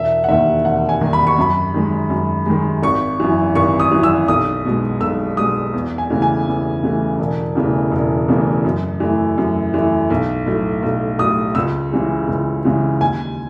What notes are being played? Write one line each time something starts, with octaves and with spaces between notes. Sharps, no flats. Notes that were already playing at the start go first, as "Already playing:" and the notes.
Already playing: E1 E5
F#5
D#2 D#3 E5
E1 F#5
G#5
D#2 D#3
B5
C#6
F#2 B5
D#3 G#3
F#2
D#3 G#3
G#1 C#6
F#2 E3
G#1 C#6
D#6
F#2 E3
E6
B1 D#6
B2 G#3
B1 E6
B2 G#3 D#6
E2
G#5
C#3 E3 A3
G#5
E2
C#3 E3 A3
E1
E2 C#3 E3 A3
E1
E2 C#3 E3 A3
F#2
E3 A3
F#2
E3 A3
B1
A2 F#3 A3
B1
A2 F#3 A3 D#6
C#2 E6
C#3 E3 G#3
C#2
C#3 E3 G#3
D#2 G#5